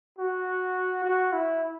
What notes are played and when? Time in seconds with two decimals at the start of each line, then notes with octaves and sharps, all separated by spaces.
0.19 F#4
1.05 F#4
1.33 E4